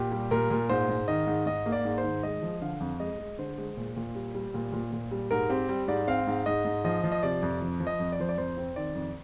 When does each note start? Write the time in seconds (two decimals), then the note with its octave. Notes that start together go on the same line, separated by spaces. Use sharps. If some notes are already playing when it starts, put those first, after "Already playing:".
Already playing: A#2 G4
0.12 G3
0.31 A#2 A#4
0.50 A#2
0.69 G#2 C5
0.89 G#2
1.08 D#3 D#5
1.27 G#2
1.46 G#2 D#5
1.66 A#3
1.72 D5
1.85 G#2
1.98 C5
2.04 D#3
2.23 G#3 D#5
2.43 F3
2.62 D3 F5
2.80 F2
3.00 G#3 D#5
3.19 G#3
3.39 D3 C5
3.58 G#3
3.77 A#2
3.97 A#2
4.15 G3
4.35 G3
4.54 A#2
4.73 A#2
4.92 A#2
5.11 G3
5.31 G#2 A#4
5.50 C4 G4
5.69 G3
5.88 G#2 D5
6.07 C4 F5
6.27 G#2
6.46 G#2 D#5
6.65 G#2
6.84 F3 D#5
7.04 F3
7.12 D#5
7.23 C3 D5
7.42 F2
7.61 F3
7.80 F3
7.87 D#5
8.00 F2
8.12 D5
8.20 F3 C5
8.29 D5
8.38 F2 C5
8.58 C4
8.76 D#3 D5
8.95 F2